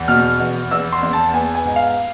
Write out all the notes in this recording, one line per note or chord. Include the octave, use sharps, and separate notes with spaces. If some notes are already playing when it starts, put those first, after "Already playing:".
Already playing: E2
B2 F6
E2
E2 E6
C6
E2
A5
B3 G#5
G#5
G#2
F5